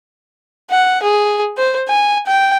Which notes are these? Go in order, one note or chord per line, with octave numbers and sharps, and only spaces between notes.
F#5
G#4
C5
G#5
G5